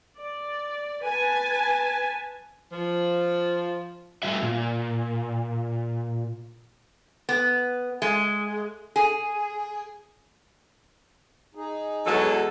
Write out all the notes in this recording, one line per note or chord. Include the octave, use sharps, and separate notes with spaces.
D5
B4 G#5 A5
F3
G3 A3 F#4 E5
A#2
B3
G#3
G#4
D#4 G#4
E2 E3 F#3 G#3 A4